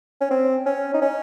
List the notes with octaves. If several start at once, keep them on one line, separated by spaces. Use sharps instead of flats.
C#4
C4
C#4
D#4
C#4